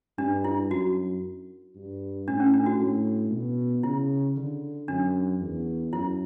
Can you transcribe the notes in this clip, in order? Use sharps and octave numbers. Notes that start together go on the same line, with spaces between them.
G2 D4
E4
F#2 F#4
G2
A2 D4
C#4
D4
F#4
A2
B2
C#3 E4
D3
F#2 D4
E2
F#2 E4